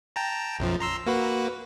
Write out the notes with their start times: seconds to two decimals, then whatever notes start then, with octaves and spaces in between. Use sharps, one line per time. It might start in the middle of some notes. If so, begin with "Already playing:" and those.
0.16 G5 A5 A#5
0.59 B1 F#2 F3
0.80 A#5 C6 E6
1.06 A#3 F#4 B4